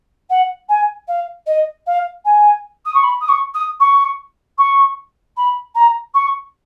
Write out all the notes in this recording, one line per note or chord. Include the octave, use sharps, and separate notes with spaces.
F#5
G#5
F5
D#5
F5
G#5
D#6
C#6
B5
D#6
C#6
D#6
C#6
C#6
B5
A#5
C#6